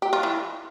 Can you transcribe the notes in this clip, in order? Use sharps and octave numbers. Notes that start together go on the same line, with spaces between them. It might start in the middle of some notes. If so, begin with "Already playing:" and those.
G4
F4
E3